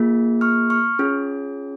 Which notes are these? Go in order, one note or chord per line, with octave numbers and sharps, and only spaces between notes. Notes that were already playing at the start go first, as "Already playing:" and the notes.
Already playing: A#3 F4 G#4
C#6 F6
C#6 F6
C#4 F4 G#4